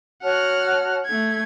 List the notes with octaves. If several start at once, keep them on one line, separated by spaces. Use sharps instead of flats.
F#4 C#5 F#5 A5 F6
A3 G#6